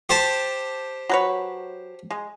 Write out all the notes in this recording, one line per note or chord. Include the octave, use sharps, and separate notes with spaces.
G4 C5 A5
F#3 B4 C#5
G#3